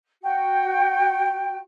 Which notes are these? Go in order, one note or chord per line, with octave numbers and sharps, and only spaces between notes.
F#4 G5